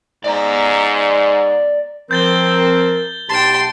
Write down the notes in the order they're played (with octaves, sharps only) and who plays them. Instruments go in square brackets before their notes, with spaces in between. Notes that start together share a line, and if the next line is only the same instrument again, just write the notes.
[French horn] G#2 [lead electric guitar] D5 A#5
[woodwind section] F3 C4 [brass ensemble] A#4 [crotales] G6 A6 G7
[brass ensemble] B1 G4 [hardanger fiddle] G5 C6 [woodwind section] A5